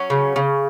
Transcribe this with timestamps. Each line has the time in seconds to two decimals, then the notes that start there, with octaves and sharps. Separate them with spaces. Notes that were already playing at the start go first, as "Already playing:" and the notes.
Already playing: F#3 C#4
0.10 C#3
0.36 C#3